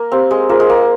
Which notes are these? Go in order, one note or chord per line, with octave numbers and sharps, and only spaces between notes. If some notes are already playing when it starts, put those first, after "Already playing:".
Already playing: A#3
C4 G4 C5 F5
G#3
A#3 F4 G#4 C5
G#3
A#3